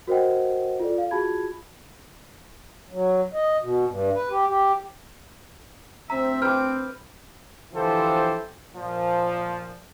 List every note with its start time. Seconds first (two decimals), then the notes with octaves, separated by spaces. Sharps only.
0.07 F#4 A#4 C5 D#5 F#5 G5
0.80 F4 A4 D5
0.98 F5
1.11 F4 F#4 G#4 A5 B5 G#6
2.91 F#3
3.33 D#5
3.61 B2
3.87 G2
4.15 B4
4.30 G4
4.47 G4
6.10 D2 C4 E5 A#5
6.42 B4 G5 D6 F6
7.74 D3 E3 F3 G4 A4 C5
8.74 A#2 F3